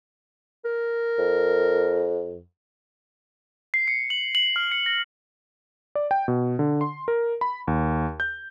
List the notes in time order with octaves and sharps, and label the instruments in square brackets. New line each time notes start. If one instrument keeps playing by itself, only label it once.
[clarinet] A#4
[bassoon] F2
[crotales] C7
C#7
F#7
F#7
F6
C#7
A#6
[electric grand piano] D5
G5
B2
D3
C6
A#4
B5
D#2
G6